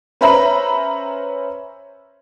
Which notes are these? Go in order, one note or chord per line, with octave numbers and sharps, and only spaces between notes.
C#4 B4 C5 E5 A#5 B5